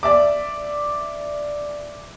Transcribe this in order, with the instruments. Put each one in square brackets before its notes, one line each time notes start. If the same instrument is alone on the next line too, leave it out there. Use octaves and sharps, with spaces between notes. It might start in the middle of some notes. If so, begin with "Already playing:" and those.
[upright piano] D5 E5 D6